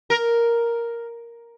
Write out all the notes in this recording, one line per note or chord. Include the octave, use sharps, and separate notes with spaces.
A#4